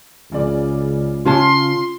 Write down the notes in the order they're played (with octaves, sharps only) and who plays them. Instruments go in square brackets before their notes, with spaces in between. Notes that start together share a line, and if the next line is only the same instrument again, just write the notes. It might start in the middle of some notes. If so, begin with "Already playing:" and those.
[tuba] C#2 [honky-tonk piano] C#3 D5
[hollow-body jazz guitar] C#3 C#4 A5 [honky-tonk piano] F4 [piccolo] C6